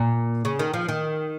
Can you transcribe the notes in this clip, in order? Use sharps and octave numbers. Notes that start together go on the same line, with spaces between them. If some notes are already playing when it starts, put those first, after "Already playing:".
Already playing: A#2
C#3
D#3
F3
D#3